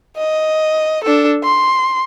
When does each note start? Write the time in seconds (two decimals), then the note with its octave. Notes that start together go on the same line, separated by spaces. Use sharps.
0.17 D#5
1.04 D4 A4
1.43 C6